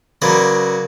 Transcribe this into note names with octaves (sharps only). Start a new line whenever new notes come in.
C#3 F#3 A#3 B4 D5 C6